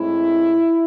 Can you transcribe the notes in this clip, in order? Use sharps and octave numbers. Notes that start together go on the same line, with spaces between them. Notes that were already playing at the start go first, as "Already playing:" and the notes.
Already playing: A2 G#3 C4 E4